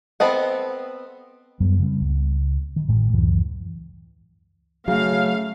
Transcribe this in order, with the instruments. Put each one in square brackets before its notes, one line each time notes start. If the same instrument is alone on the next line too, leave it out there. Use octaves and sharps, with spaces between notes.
[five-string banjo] B3 C4 A4 D#5 F#5
[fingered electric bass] F#2 F#3 G3 B3
C#3 G3 C4
C#2
D#3
A1 A2 G#3
C#2 F#2 E3
[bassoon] C#3 [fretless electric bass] F#3 [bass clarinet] A3 [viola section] F5